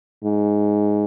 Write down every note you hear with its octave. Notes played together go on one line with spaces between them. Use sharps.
G#2